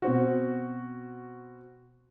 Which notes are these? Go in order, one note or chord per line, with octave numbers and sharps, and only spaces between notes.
B2 C4 F#4